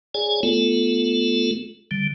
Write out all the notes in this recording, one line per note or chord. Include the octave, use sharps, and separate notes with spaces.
G#4 C#5 D5 G#5
A3 B3 F4 A4
D3 G3